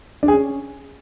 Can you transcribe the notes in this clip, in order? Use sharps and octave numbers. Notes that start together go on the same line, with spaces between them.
D4
G#4
C#4